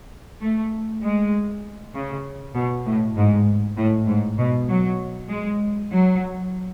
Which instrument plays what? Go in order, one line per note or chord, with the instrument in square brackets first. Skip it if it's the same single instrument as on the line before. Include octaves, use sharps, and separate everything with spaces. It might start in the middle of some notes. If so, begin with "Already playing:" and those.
[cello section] A3
G#3
C#3
B2
A2
G#2
A2
G#2
B2
F#3
G#3
F#3